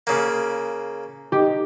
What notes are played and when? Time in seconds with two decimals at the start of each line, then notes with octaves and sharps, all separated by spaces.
0.07 C#3 A#3
1.32 D#4 G4